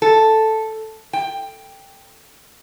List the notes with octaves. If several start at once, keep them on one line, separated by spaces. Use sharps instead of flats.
A4
G5